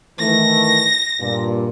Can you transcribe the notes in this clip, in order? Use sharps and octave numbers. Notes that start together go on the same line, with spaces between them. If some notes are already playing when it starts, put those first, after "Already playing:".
D#3 E3 A3 A#6
G2 A#2